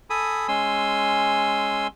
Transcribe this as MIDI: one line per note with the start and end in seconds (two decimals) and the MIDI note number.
0.10 0.47 69
0.10 0.47 80
0.10 0.47 83
0.10 0.47 87
0.48 1.87 56
0.48 1.87 61
0.48 1.87 80
0.48 1.87 84
0.48 1.87 88